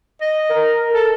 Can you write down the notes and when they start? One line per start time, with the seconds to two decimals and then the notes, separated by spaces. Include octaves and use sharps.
0.21 D#5
0.49 A#4
0.93 A4